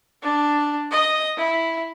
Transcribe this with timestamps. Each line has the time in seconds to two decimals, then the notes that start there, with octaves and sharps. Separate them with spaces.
0.23 D4
0.91 D#5
1.37 E4